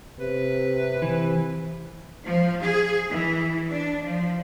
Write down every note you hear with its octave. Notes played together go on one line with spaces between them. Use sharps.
C3 B4
E3
F3
G#4
E3
D4
F3